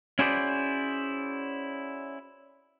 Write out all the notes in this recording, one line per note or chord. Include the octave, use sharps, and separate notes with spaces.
C#4 E4 F#4 G#4 C5 D5